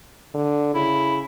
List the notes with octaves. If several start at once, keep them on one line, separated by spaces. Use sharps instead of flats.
D3
C#3 E4